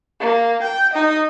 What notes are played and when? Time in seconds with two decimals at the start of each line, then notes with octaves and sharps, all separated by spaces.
0.20 A#3
0.62 G5
0.93 D#4 D#5